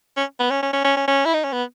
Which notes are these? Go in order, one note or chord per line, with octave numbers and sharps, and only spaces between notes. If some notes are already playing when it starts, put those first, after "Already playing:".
C#4
B3
C#4
C#4
C#4
C#4
C#4
C#4
E4
D#4
C#4
B3